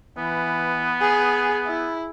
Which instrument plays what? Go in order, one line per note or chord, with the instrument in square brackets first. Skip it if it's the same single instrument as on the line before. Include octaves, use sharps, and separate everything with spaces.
[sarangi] E3 [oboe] B3
[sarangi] G#4
E4